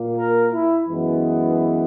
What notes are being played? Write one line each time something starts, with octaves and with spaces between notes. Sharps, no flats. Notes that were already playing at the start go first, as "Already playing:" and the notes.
Already playing: A#2 A#3
A#4
E4
F#2 E3 G#3 B3